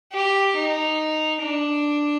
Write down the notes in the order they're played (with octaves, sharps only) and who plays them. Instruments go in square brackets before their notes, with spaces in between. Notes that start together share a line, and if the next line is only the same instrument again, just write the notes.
[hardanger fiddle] G4
D#4
D4